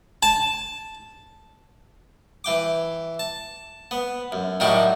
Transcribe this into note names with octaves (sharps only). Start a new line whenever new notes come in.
A5
E3 G5 D6
A5
B3
F#2
A2 D#3 F#3 G3 F#4 G4